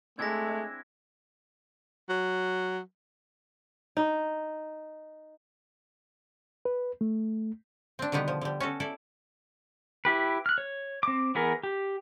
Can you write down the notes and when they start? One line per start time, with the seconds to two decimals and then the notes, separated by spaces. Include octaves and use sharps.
0.19 G#3 A3 C4 D4 E4 G#6 A#6
2.09 F#3
3.97 D#4
6.65 B4
7.01 A3
7.99 C4 D4
8.12 B2 D3 D#3 G3 B3
8.28 F3
8.41 D3 G3
8.60 C#4 F#4 A4
8.80 E4 A4 D5
10.05 E4 G4 B4
10.46 F6 F#6
10.58 C#5
11.03 C4 D6
11.35 E3 B3 G#4 A#4
11.63 G4